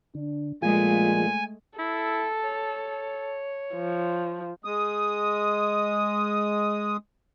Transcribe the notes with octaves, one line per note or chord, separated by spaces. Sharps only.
D3 D4
A#2 F3 G#3 A3 F4 G#4 G#5
E4 A4
C#5
F3
G#3 D#6